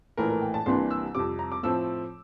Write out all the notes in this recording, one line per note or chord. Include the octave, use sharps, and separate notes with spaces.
A#1 A2 E3 A3 A#4
A#4
G5
A5
C2 C3 E3 A#3 D4 C6
E6
F2 C3 G3 D6
A#5
D6
A2 F3 A3 C4 E6